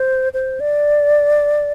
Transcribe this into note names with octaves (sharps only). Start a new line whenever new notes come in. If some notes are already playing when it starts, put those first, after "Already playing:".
Already playing: C5
C5
D5